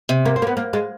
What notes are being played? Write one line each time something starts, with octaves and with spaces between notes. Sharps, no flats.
C3
A#3
C4
A#3
B3
A#3
G#3